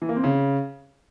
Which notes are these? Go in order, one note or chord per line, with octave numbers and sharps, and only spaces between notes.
E3
A#3
C4
C#3